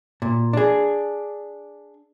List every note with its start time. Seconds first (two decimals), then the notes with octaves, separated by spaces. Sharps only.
0.22 A#2
0.53 D4 G#4